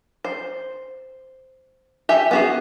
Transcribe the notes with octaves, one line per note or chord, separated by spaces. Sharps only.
C5
G4 E5 G#5
B3 F#4 G#4